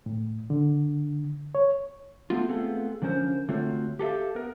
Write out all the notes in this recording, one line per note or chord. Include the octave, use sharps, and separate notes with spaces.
A2
D3
C#5
A3 B3 F4
A3 B3 C4 F4 G#4 A4
D3 F3 C#4 A#4 C5
D3 A3 C4 F4 F#4 C#5
G4 A4 A#4 E5 F5
B3 A#4